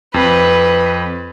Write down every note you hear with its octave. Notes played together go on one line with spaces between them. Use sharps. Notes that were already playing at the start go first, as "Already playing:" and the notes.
F2 B4